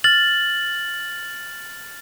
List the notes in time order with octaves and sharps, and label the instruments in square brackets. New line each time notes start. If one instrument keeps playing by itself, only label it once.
[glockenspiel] F6 A6 F#7